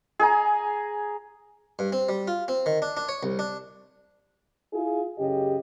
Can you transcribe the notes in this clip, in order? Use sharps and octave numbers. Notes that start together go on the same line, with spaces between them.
G#4 G#5 A#5
G2
C4
G3
F4
C4
D#3
D4
D4
C#5
C2
D4
E4 F4 G#4
F#2 C#3 G4 D#5